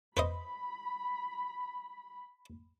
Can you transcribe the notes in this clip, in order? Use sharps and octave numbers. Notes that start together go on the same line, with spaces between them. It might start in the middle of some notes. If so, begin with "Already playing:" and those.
B4 C5 D#5 B5